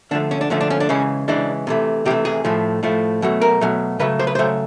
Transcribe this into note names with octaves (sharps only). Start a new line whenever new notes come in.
D3 F3 A3 D4
C#4
D4
D3 F3 A3 C#4
D4
C#4
D4
C#3 E3 G#3 C#4
C#3 E3 G#3 D4
C3 E3 A3
C3 E3 A3 G4
G#4
A2 F3 A3
A2 F3 A3
B2 F#3 A3
A#4
B2 F#3 A3
C#3 F#3 A3 B4
C5
B4
C#3 F#3 A3 C5